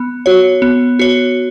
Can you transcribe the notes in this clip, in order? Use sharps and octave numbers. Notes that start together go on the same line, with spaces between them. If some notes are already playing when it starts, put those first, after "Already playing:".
Already playing: B3
F#4 C#5
B3
F#4 C#5